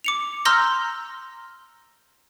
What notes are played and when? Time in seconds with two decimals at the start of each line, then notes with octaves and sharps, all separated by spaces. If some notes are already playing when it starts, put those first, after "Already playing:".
0.04 D6 C#7 F7
0.45 A#5 C6 E6 F6 G6 A#6